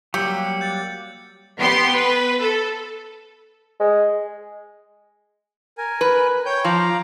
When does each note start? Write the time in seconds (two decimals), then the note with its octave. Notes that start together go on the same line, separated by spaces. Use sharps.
0.14 F#3 G3 A#3 G4 E6 C#7
0.61 G6 A6
1.59 B3 G4 C6
1.93 B4
2.41 A4
3.80 G#3
5.78 A#4 G#5
6.01 B4
6.46 C#5 G5 G6
6.64 F3 F5 A#5 D6